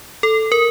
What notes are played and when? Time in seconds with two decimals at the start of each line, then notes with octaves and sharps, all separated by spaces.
0.23 A4
0.52 A#4